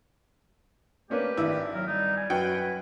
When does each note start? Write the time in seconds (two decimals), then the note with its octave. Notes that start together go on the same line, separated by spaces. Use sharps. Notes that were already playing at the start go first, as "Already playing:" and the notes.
1.10 A3 A#3 C#4 D4 G4 A#4 B4
1.37 G#1 D4 E4 E6
1.74 F#3 A#4
1.88 G3 D#4
2.17 G#5
2.30 F#2 F#4 B4 F#5 G5